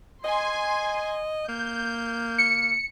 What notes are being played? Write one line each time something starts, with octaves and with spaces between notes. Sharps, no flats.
D#5 G#5 C6
A#3 G6
C#7